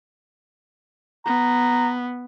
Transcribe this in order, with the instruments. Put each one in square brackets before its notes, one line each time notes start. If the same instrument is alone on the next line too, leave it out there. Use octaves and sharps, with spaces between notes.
[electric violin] B3 [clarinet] A#5